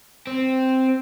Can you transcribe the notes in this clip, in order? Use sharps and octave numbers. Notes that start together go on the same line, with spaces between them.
C4